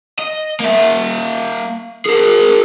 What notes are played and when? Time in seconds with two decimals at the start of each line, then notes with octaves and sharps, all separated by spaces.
0.19 D#5
0.60 A#3 E5
2.06 G#4 A#4